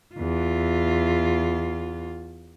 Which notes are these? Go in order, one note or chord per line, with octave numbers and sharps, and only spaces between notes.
E2 F4